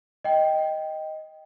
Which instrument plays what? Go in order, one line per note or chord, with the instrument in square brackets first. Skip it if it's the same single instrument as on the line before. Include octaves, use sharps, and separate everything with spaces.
[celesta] D#5 G5